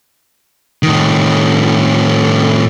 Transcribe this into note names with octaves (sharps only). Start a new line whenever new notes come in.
A2 D#3